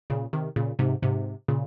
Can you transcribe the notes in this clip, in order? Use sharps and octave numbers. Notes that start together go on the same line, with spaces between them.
A#2 C#3
C3 D#3
A#2 C#3
G#2 C3
G#2 C3
A#2 C#3